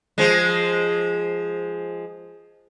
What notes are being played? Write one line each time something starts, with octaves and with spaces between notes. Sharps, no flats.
F3 G#3